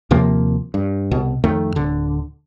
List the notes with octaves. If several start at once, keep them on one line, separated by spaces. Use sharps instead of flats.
D#2 C3 F3 A#3
G2
C2 B2
F2 D#3 A3
D1 D3